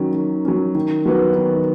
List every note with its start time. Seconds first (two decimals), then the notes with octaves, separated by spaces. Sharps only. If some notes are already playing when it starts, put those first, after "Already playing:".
Already playing: D#3 F#3 C#4
0.15 D#3
0.45 F#3 C#4
0.75 D#3
1.05 F#3 B3 F#4
1.35 D#3